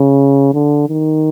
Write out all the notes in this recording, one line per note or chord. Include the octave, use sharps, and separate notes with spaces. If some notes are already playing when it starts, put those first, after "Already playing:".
Already playing: C#3
D3
D#3